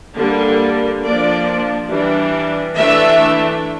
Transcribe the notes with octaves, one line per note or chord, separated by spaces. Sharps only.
D3 G3 A#3 D4
F3 A#3 D4 D5
E3 G3 D4
E3 A3 D4 E5